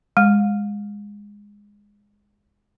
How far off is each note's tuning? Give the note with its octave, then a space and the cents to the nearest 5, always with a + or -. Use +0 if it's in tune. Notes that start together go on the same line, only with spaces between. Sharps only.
G#3 -15